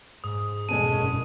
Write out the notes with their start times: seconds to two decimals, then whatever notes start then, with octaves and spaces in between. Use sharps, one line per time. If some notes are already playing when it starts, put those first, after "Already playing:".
0.24 G#2 D#6
0.69 E1 B2 G#3 C#4 F#4 A4 D#7
0.93 F#1